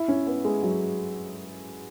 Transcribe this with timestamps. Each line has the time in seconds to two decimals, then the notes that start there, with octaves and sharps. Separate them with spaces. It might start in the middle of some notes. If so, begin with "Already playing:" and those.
Already playing: E4
0.08 C#4
0.26 B3
0.45 G#3
0.63 F#3